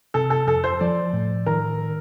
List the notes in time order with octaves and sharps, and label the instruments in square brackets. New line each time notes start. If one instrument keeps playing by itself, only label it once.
[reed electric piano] C3 [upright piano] A4
[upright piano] A4
[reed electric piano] F2 [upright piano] A4
[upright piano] C5
[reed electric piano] F3 [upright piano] D5
[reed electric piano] A2
[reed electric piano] D#3 [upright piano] A#4